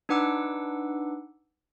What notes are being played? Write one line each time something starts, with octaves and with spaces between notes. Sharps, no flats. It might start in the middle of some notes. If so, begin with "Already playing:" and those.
D4 D#4 B4 F#5 D6 E6